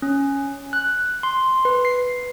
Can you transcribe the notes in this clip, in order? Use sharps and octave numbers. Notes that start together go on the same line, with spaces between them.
C#4
F#6
C6
B4
C7